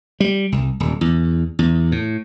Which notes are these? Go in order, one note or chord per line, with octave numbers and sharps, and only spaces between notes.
G3
C2
D#1
E2
E2
A2